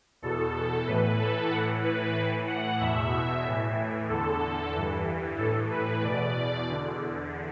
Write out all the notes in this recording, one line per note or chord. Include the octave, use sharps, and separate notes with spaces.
E2 B2 A4
A2 E3 B4
A4
A2 E3 F#5
B4
A2 E3 B4
F#5
E2 B2 E5
A2 E3
E2 D3 A4
G2 E3
A2 E3 A4
B4
E2 B2 D5
E2 D3